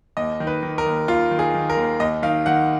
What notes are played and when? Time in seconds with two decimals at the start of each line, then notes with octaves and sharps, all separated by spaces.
0.17 D#2 D#5
0.40 D#3
0.47 B4
0.63 D#3
0.78 A#4
0.86 D#2
1.08 D#2 F4
1.31 D#3
1.39 G#4
1.54 D#3
1.70 A#4
1.77 D#2
2.00 D#2 D#5
2.22 D#3 F5
2.46 D#3 F#5